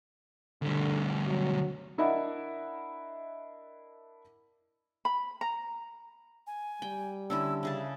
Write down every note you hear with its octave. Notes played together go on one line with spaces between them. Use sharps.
D2 D3 G3
F#3
D4 E4 A#4 D#5 E5 F#5
B5
A#5
G#5
G3 G5
D3 C#4 E4 E6
C#3 G#4 E5 A5